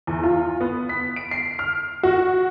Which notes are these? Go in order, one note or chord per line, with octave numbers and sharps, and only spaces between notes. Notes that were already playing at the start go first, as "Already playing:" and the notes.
E2
F4
B3
B6
D7
C7
F6
F#4